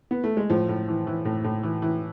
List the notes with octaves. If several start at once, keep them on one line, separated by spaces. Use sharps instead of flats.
B3
A3
G#3
A2 F3
A2
E3
E3
A2
A2
E3
E3